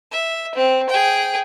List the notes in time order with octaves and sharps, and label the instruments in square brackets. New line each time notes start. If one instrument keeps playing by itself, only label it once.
[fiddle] E5
C4
G#4 G5